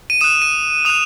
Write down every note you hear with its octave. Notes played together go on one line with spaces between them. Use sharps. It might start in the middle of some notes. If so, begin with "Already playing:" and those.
D#7
D#6 F#6 E7
D#7
D#6 F#6 F7